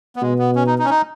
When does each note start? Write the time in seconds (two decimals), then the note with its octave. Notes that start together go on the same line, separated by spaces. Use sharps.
0.16 B3
0.22 B2 G#3
0.39 B3
0.56 C#4
0.67 D#4
0.78 D#4
0.85 C#4
0.90 D#4